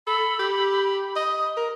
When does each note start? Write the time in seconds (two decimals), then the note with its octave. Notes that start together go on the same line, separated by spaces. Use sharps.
0.07 A4 B5
0.39 G4
1.16 D#5
1.57 A#4